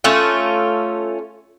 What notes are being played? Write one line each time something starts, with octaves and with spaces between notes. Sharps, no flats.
A3 C#4 F4